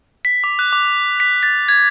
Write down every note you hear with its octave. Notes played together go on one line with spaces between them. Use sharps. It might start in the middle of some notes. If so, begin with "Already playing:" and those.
B6
D6
F#6
D6
B6
A6
G#6